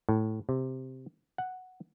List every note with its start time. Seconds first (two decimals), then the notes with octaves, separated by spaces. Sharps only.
0.09 A2
0.49 C3
1.38 F#5